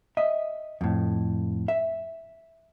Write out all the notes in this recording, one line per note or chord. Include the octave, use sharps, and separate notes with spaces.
D#5 E5
F2 A2
E5